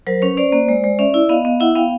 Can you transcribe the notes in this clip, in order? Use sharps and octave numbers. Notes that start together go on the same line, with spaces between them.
F#3 A#4 C5
C#4 B4 C#5
C#4 C5 D5
A#3
G#3
G#3
C#4 D5 E5
E4
B3 D#5 F5
B3
E4 E5 F#5
B3 F5 G5